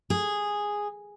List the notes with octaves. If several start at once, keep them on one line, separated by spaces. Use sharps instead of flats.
G#4